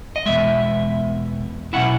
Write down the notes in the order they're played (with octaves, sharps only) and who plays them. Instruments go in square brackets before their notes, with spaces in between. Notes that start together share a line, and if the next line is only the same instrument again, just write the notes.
[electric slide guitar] D#5
E2 B2 G#3 E5
B2 F#3 C#4 E4 F#5